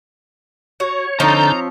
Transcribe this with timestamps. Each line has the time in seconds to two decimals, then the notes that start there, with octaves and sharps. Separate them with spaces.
0.80 F#4 C#5
1.20 D3 F3 C4 D#4 C#5 A5 A#5 G6